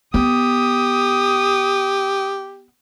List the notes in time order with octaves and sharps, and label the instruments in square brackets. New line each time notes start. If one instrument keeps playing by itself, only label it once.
[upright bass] B3 [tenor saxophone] G4 [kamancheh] D#6